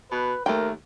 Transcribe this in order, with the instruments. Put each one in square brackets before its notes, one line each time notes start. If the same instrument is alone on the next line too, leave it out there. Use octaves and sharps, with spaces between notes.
[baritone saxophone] B2 [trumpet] B4
[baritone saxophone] D#2 [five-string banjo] A3 G5 [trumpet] A#4